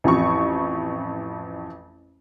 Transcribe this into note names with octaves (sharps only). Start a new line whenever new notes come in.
A1 F2 C#6